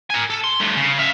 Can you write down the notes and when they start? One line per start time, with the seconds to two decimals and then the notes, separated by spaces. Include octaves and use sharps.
0.10 A#4 G#5
0.30 A4
0.44 C6
0.60 G2 A3
0.76 C#3
0.99 E5 F5